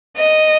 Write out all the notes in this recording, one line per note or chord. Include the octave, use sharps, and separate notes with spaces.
D#5